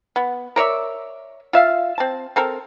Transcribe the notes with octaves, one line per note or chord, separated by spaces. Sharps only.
B3
A#4 C#5 D5 E5
F4 E5 F5
C4 A5
C4 A4 A#4